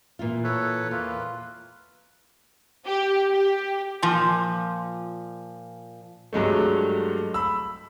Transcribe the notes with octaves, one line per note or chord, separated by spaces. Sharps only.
A#2 E3 F4
A4 B4 C#5
E2 A#3 F4 B4
G4
G4
A#2 F3
G2 F#3 G#3 A3
B5 E6